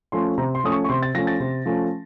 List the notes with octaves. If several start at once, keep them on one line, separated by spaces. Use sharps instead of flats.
F3 A3 C#4 C6
C3 A#5
C6
F3 A3 C#4 D#6
C#6
C#6
C3 C6
A6
F3 A3 C#4 A#6
A6
C3
F3 A3 C#4